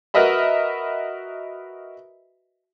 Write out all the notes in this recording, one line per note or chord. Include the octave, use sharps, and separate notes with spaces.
F#4 A#4 B4 D#5 E5 B5